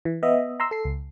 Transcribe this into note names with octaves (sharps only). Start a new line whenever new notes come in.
E3
B3 D#5 E5
A#5 C6 E6
A4 C7
C#2